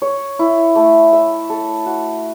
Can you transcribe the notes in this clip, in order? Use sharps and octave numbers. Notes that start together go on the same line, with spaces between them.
C#5
E4
A3
E5
A4
F#4